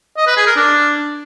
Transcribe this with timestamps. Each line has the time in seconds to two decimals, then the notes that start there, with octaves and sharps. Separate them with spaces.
0.17 D#5
0.27 B4
0.37 G#4
0.46 A#4
0.56 D4